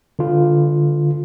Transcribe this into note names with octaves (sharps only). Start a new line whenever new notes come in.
D3 F4